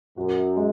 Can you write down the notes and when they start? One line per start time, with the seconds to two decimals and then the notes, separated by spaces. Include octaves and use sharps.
0.17 F#2 F#4
0.57 G#3